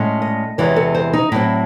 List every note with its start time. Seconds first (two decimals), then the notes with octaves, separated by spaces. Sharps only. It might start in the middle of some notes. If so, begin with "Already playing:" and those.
Already playing: A2 G#3 C#4
0.22 D#5
0.58 E2 C3 E3 G#3 C#5
0.76 A4
0.95 C5
1.13 D#4
1.32 A2 F#3 C4 E4